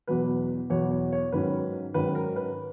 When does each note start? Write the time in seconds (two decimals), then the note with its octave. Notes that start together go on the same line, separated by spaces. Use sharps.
0.07 E2 B2 F#3 B3 B4
0.70 E2 B2 F#3 B3 C#5
0.91 C#5
1.12 C#5
1.32 G#2 D#3 F#3 C#4 B4
1.94 G#2 D#3 F#3 C#4 B4
2.15 A#4
2.36 B4